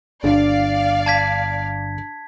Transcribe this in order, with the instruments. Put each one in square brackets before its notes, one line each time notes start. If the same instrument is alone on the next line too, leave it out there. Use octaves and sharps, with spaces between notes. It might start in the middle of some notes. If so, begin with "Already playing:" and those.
[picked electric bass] G1 [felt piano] D4 [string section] D5 F5
[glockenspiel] A5 G#6 B6